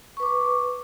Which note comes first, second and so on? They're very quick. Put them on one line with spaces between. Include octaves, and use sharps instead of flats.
C#6 B4 D6